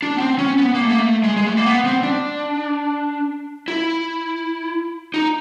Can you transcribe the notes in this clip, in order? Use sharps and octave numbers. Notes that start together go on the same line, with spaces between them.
D4
B3
C4
C#4
B3
A#3
A3
A#3
A3
G#3
G#3
A3
A#3
B3
C4
D4
E4
D#4